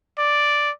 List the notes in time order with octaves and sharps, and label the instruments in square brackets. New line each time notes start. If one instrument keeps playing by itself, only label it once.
[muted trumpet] D5